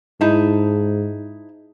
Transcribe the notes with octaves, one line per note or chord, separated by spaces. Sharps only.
G#2 D#4 E4 A5